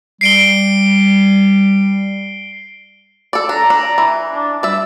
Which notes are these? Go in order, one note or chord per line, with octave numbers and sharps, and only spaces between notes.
G3 C7 D7 G7
A4 D5
D4 A#5
D4
E3
D4
G3 D5 E5 E6